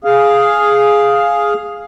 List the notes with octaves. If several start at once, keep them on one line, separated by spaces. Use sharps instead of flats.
G#4 F5